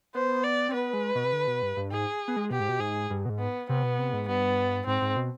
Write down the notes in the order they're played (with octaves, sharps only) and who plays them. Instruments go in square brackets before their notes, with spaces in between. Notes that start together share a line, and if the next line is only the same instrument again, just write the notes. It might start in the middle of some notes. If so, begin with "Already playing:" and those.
[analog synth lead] B3 [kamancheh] C5
[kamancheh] D5
[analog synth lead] C4
[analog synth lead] B3 [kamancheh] B4
[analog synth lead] G#3
B2
C3
D3
B2
G2
G2
[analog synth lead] G#2 [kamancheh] G#4
[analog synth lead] B3
G#3
[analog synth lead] B2 [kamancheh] G4
[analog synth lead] G#2
B2
[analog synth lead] G#2 [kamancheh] G#4
[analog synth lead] G2
B2
G#2
[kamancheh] B3
[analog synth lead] C3 [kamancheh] B3
[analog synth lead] B2
C3
G#2
[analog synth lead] G2 [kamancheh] B3
[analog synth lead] G#2 [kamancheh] C4
[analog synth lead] G#2
B2